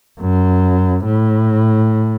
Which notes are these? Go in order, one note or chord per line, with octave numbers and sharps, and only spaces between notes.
F#2
A2